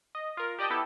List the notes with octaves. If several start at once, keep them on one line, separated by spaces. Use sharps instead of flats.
D#5
F4 A#4
G4 D5 D#5 G5 A5
B3 E4 G4 A4